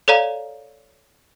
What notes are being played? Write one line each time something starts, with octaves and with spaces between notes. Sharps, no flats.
A4 C#5 D5 F5 A#5